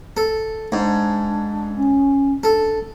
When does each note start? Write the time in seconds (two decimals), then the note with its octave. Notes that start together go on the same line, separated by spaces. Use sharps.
0.17 A4
0.72 G#2 D4
1.75 C#4
2.44 D4 A4